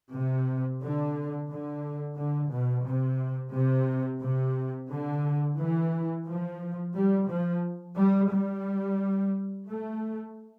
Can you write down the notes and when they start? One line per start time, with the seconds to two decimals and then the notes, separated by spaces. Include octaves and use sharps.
0.13 C3
0.82 D3
1.50 D3
2.17 D3
2.52 B2
2.87 C3
3.54 C3
4.22 C3
4.91 D3
5.58 E3
6.28 F3
6.95 G3
7.30 F3
7.97 G3
8.31 G3
9.68 A3